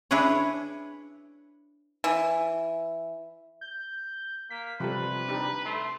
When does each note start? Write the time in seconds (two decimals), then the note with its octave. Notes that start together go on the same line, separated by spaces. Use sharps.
0.11 D4 E4 G#4 B4 C#5
2.04 E3
3.61 G6
4.50 A#3 B6
4.80 C3 F3 G3 A4 B4
5.28 D4 D#4 G4
5.65 A3 C6